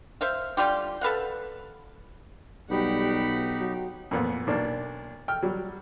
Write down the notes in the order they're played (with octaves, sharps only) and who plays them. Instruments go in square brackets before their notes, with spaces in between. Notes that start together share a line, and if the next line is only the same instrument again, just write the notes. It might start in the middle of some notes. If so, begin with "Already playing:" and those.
[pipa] C5 E5 F5
D3 G3 F4 G4
A4 B4 F5 F#5
[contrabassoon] B1 [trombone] G3 [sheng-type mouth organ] D#4 G4 [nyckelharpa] F#5 B5
[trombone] F#3
[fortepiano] F2 A#2 B3
B1 A#3 D4
G5 F6
F#3 G3